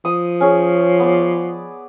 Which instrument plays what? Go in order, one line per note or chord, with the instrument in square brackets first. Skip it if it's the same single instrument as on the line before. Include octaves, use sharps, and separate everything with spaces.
[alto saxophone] F3 [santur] D#6
[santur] C#4 G#4
B3 D5